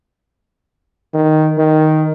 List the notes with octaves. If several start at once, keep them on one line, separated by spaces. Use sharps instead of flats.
D#3
D#3